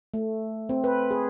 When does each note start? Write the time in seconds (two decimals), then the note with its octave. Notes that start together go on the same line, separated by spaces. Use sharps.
0.14 A3
0.69 C4
0.84 B4
1.11 G#4